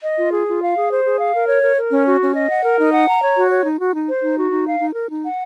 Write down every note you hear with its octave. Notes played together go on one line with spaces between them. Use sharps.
D#5
F4
G#4
F4
F5
G#4
C5
G#4
F5
A#4
C#5
A#4
A#4
C#4
F#4
C#4
D#5
F#5
A#4
D#4
F#5
A#5
C#5
F#4
C#5
D#4
F#4
D#4
C5
D#4
F#4
D#4
F5
D#4
A#4
D#4
F#5